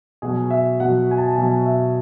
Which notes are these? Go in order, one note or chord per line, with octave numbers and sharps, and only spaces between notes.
B2 F#3 G#4
E5
B2 F#3 F#5
G#5
A5
B2 F#3 G#5
E5